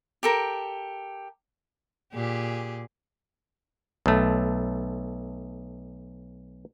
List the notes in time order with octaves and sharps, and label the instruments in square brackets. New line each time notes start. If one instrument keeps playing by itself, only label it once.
[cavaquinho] G4 A4 A#4
[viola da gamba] A#2 G4 G#4
[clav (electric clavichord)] B1 A3